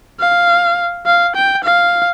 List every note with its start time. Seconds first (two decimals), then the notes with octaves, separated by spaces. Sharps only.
0.20 F5
1.06 F5
1.36 G5
1.64 F5